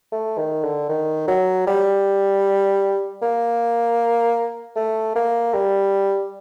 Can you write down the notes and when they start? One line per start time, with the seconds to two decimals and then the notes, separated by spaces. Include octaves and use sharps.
0.12 A3
0.38 D#3
0.64 D3
0.89 D#3
1.28 F#3
1.67 G3
3.22 A#3
4.76 A3
5.15 A#3
5.54 G3